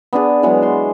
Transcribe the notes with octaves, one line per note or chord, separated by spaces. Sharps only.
B3 D4 G#4
E3 F#3 G#3 B3
C6